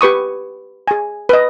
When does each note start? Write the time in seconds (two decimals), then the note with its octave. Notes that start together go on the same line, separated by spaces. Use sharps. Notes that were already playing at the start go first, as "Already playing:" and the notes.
0.01 G4 B4 C#6 D#6
0.88 G#4 G#5
1.29 B4 D#5